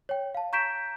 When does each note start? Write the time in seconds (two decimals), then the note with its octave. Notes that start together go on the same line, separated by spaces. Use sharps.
0.09 C#5 G5
0.34 F5 A5
0.53 A#5 C#6 G6 B6 D7 E7